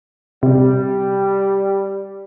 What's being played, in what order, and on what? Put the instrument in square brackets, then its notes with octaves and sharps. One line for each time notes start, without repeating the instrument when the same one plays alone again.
[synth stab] C3 [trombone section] G3